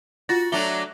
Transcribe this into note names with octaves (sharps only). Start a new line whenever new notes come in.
F4 F#4 A6 A#6
F#3 A3 D4 D5 E5 G7